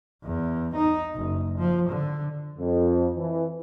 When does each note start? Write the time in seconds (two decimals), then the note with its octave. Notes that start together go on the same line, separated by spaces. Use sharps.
0.24 E2
0.76 D#4
1.15 F#1
1.59 F3
1.89 D3
2.58 F2
3.16 E3